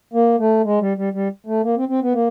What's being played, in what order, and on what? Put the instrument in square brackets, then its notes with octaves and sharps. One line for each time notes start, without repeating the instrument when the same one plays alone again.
[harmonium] A#3
A3
G#3
G3
G3
G3
A3
A#3
C4
C4
B3
A#3